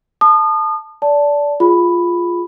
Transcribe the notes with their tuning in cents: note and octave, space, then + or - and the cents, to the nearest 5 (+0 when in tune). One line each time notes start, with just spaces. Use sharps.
A5 +0 D#6 -35
D5 -20 A5 +0
F4 +0 G#4 +0 B5 +0